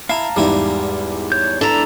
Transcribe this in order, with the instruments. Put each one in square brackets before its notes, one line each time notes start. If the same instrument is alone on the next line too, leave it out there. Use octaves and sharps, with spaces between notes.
[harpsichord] E4 [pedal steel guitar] F5 A5 A#5
[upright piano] E2 G#2 [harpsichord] G3 E4
[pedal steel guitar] C#5 G6
[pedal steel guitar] D4 E4 D5 [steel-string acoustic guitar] A4 A#5